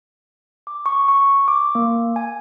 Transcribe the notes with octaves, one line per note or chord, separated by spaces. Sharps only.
D6
C#6
C#6
D6
A#3
G#5